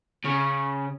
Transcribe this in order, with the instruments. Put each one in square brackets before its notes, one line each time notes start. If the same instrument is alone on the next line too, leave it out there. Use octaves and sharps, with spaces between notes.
[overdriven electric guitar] C#3 [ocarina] C#6